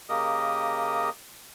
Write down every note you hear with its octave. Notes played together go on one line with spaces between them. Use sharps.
C#3 A#3 G4 A#4 D#5 D#6